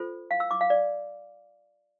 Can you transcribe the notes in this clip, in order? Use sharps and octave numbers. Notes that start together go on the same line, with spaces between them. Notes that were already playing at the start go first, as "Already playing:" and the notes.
Already playing: F4 A4 C5
F5
E6
D6
F5
D5